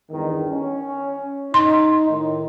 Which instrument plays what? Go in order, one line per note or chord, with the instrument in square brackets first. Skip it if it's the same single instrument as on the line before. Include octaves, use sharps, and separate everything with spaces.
[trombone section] E2 G2 D#3
C#4
[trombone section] D#4 [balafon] C6
[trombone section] A2 D#3